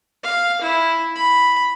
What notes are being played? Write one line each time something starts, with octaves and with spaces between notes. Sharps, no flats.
F5
E4
B5